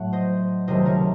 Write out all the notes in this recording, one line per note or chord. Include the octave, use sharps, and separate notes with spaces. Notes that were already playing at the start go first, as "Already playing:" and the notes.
Already playing: A2 F#3 A3 F#5
C5 D#5
C#2 C3 D#3 F#3 A3 C5 D#5
A#4 C#5